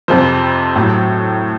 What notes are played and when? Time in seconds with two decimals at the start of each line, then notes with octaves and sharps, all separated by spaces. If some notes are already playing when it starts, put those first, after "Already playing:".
0.08 F2 C3 F3 C5
0.76 A2 F#3